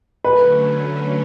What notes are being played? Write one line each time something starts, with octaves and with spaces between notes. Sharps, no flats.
D3 F#3 A3 C#4 B4